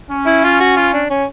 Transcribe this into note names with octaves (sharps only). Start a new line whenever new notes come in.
C#4
E4
F4
F#4
F4
D4
C#4